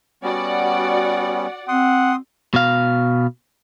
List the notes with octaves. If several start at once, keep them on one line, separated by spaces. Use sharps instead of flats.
G3 B3 C#4 F#4 D5 F#5
C4 F#5 C6 D#6
B2 F5